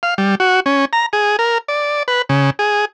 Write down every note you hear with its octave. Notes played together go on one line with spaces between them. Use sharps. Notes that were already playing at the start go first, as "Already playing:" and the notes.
F5
G3
F#4
C#4
A#5
G#4
A#4
D5
B4
C#3
G#4